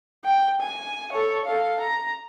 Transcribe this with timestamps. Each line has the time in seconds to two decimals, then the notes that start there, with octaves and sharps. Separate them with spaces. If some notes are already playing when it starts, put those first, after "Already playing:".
0.24 G5
0.60 G#5
1.12 A4 C#5
1.45 A4 F5
1.80 A#5